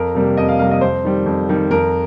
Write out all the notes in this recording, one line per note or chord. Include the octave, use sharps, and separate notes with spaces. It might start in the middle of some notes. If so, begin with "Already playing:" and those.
Already playing: F2 A#4
C3 G3 A#3
F2 D#5
F5
C3 G3 A#3 F5
D#5
F2 C5
D#3 G3
F2
D#3 G3
F2 A#4